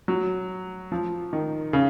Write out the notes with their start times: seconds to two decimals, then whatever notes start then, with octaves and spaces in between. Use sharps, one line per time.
0.08 F#3
0.92 F3
1.33 D#3
1.73 C#3